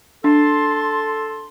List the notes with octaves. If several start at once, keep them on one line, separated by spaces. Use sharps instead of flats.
D4 A4 A5 C6